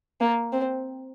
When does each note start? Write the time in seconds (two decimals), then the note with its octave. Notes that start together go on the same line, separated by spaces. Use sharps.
0.21 A#3
0.53 C4